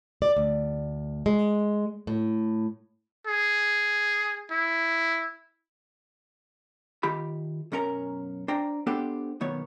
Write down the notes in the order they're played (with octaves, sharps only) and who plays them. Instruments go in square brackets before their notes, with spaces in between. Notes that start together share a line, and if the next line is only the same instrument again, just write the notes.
[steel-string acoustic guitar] D5
D2
G#3
A2
[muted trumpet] G#4
E4
[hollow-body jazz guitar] D#3 F4 G4 B5
B1 F#2 C#4 A#4 A#5
D4 C5 G5 A#5
B3 D4 G4 A4 C5
B1 D#3 B3 C#5